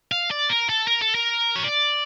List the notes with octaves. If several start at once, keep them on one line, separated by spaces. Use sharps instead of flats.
F5
D5
A#4
A4
A#4
A4
A#4
C#5
D5